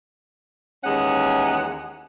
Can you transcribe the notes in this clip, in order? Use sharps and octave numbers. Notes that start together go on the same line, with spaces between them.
D#2 E3 G#3 C#4 F#5